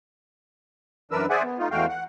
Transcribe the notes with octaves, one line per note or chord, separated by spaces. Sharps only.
F#2 E3 D4 A#4 B4 E6
G#4 C5 D5 E5 F#5 G#5
B3
A3 D#4 F4
E2 G#3 A3 F#4 F5 G5
F#5